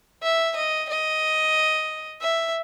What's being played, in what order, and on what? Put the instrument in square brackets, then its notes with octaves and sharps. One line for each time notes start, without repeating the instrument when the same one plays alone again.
[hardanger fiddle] E5
D#5
D#5
E5